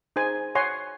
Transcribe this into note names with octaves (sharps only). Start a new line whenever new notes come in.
D#4 G#4 C5 G#5
C#5 F#5 G#5 C6